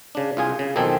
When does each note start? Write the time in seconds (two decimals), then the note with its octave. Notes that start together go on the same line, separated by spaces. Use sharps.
0.15 C#3 D4
0.37 C2 F4 G#4 G#5
0.59 C#3
0.76 B1 F2 D#3 C4 A4 G#5